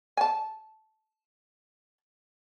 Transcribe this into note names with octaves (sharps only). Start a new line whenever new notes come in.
G#5 A5